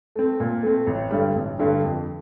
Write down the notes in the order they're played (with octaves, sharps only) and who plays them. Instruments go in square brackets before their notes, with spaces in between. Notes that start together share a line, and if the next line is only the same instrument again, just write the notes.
[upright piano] A3 C4
A#2
A3 C4
A1
G2 D3 G3
A1
G2 D3 G3
F2